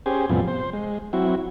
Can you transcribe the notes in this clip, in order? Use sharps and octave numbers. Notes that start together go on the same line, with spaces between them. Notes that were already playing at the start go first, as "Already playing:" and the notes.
C#4 G4 G#4 C5
F2 A2 C3 F3 G3 B3
C5
G#3
F#3 C4 E4 F#4